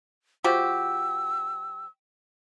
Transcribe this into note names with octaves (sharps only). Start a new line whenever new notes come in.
F3 F#4 G4 E6